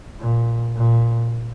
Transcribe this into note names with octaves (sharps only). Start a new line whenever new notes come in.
A#2
A#2